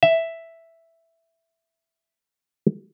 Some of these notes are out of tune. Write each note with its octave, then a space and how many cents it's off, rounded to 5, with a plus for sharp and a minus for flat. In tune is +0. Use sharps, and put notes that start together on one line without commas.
E5 +0